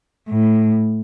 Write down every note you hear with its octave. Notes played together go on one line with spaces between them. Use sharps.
A2